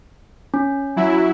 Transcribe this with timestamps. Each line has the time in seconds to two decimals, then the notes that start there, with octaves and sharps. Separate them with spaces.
0.54 C#4
0.96 F#3 E4